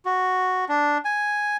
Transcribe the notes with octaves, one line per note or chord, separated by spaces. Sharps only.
F#4
D4
G#5